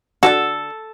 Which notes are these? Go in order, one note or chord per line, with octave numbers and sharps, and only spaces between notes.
D3 F4 F#4 A4